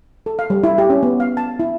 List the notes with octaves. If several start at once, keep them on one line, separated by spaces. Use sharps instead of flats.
A4
F5
G3
E4
G4
C#4
B3
F5
A5
E4